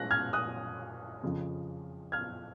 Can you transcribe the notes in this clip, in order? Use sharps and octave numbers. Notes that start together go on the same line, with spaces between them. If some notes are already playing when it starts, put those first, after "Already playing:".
Already playing: G#3 C#4 F#6 A#6
F6 G#6
D#6 F#6
F2 C#3 F3
F6 G#6